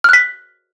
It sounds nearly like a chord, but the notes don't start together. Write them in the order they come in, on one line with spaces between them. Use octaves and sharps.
F6 F#6 B6